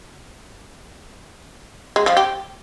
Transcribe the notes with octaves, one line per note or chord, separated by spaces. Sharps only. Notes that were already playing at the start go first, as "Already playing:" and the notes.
G#3
F3
G4